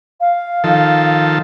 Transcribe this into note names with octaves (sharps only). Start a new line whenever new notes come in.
F5
D#3 F3 A4